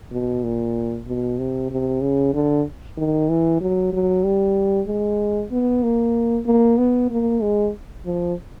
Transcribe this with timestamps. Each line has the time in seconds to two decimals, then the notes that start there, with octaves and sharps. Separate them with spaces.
0.12 B2
0.43 A#2
1.07 B2
1.38 C3
1.70 C3
2.01 C#3
2.34 D3
2.97 D#3
3.29 E3
3.61 F#3
3.92 F#3
4.24 G3
4.87 G#3
5.51 B3
5.83 A#3
6.46 A#3
6.78 B3
7.10 A#3
7.41 G#3
8.05 F3